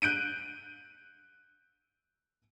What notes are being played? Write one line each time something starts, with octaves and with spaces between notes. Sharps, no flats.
F#6 G6 D7 D#7